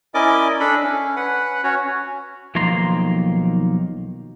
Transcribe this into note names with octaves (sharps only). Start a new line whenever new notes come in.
C#4 E4 A#4 D5 D#5 D6
D4 A4 B5
C#4
B4 F#5
C#4 F#4 C#5
B1 D#3 F3 A#3 A#5 C6